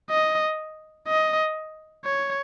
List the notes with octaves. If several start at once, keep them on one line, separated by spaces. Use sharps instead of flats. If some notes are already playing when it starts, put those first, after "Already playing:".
D#5
D#5
C#5